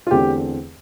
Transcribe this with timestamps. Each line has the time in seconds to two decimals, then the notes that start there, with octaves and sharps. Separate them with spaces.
0.07 F4
0.11 E2 D3 A3 C4 G4